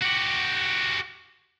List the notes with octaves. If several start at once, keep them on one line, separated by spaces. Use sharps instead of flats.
F#4 G4